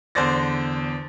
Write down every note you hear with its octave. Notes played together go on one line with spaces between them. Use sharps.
E2 D3 C5 D5 A6 A#6